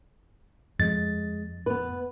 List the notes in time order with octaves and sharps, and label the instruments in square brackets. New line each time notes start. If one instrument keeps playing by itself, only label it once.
[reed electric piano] F2 A6 [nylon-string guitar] G#3
[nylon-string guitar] B3 B4